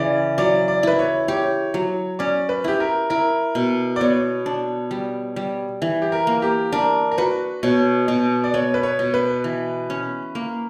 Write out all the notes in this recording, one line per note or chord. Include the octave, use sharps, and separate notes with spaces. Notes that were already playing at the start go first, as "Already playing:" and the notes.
Already playing: C#3 E3 D5
F#3 D5
D5
E4 B4
C#5
G4 C#5
F#3
C#4 D5
B4
E4 G4
A#4
E4 A#4
B2
D5
B3 C#5
D4
G3
G3
E3
G4
A#4
A#3
G4
D4 A#4
A#4
F#4 B4
B2 C#5
B2
D5
B3 C#5
B4
C#5
B2
B4
E3
C#4
A#3